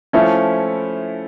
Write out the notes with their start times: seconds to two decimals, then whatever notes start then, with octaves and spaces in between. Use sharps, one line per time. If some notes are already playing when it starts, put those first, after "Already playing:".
0.13 F3 A3 C#4 E4